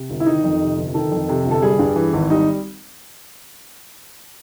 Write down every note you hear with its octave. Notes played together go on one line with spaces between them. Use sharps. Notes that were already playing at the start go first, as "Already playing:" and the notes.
Already playing: C3
G1
E4
D#3 D#4
F2
C3
G1
D#3 A4
F2
C3
G1
A4
G3 G#4
G2
E3
G#1
G3 D#4